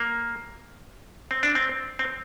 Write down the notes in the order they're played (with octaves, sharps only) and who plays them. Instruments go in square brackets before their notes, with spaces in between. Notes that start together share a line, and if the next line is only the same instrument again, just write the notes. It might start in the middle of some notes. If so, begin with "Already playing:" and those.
Already playing: [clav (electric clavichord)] A#3
C4
D4
C4
C4